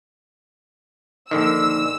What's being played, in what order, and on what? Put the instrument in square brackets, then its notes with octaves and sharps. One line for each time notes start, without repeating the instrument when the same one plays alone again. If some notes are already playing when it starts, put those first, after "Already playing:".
[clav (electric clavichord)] A#1 D3 D#3 [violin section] E6